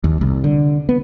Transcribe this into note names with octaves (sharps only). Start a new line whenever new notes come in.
D#2
C2
D3
B3